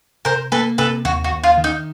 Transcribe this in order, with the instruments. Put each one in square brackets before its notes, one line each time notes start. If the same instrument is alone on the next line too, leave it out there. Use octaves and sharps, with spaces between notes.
[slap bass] C3 [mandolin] A#4 C5
[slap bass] A#3 [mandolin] A4 B4
[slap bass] C3 [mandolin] A4 B4
[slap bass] D#2 [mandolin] F#4
[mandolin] F#4
[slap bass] D#2
[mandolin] F4
[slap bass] D#3
[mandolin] D#4